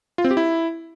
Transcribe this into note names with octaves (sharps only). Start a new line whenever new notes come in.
F4
C4
G4
E4